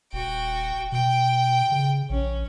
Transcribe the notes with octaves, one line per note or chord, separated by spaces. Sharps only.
D#1 F#4 G5
B2 G5
C#3
A#1 C#4